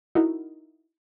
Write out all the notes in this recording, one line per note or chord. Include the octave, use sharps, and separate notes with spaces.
D#4 E4 F#4 A#4